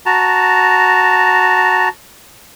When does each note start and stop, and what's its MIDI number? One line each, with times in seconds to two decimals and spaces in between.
0.06 1.89 66
0.06 1.89 81
0.06 1.89 82